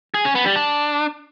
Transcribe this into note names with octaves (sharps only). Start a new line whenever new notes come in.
G#4
C#4
B3
G3
D4